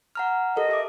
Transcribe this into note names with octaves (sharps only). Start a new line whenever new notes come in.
F#5 A#5 F6
G4 A4 A#4 D#5
G4 E5 D6